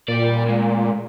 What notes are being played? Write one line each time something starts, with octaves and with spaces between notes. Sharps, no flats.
A#2 G3 D5
D2 G#3